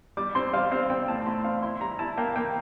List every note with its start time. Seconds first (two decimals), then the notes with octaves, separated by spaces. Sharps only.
0.17 G3 D6
0.35 C4 C6
0.53 G3 F5
0.71 C4 F5
0.90 C4 G5
1.08 A2 A5
1.26 A2 C6
1.44 C4 F5
1.62 E4 C6
1.81 G3 A#5
1.99 E4 A5
2.17 A#3 G5
2.36 A#3 G5